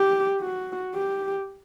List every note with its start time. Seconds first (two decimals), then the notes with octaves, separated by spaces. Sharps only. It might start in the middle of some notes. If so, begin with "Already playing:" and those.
Already playing: G4
0.41 F#4
0.95 G4